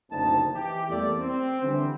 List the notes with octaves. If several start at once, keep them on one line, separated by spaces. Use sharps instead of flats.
F#1 D2 A#2 C4 D#4 A5
E3 G4
E2 G3 A3 A#3 A4 D5
C4
D3 E3 G3 C4